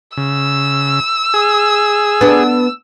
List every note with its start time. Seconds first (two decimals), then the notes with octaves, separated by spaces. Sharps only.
0.17 C#3 E6
1.34 G#4
2.21 B3 D4